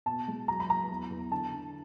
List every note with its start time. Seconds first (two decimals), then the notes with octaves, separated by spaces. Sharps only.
0.06 B2 A5
0.28 G#3
0.48 F#3 A#5
0.60 B5
0.69 F#3 A#5
0.90 E2
1.10 E2
1.31 D3 A5
1.52 D3